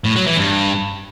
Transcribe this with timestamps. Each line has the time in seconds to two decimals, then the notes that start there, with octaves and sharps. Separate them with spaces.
0.05 A2
0.16 F#3
0.27 E3
0.38 G2